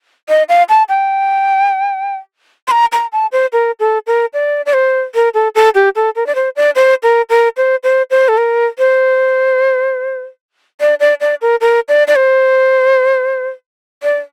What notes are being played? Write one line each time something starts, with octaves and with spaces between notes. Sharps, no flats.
D#5
F5
A5
G5
C6
A#5
A#5
A5
C5
A#4
A4
A#4
D5
D5
C5
A#4
A4
A4
G4
A4
A#4
D5
C5
D5
C5
A#4
A#4
C5
C5
C5
A4
A#4
C5
D5
D5
D5
A#4
A#4
D5
D5
C5
D5